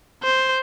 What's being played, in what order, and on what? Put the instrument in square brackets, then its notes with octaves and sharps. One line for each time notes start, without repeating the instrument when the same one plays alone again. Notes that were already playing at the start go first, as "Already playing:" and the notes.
[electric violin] C5